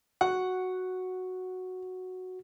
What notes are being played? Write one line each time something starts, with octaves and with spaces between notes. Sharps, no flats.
F#4 F#5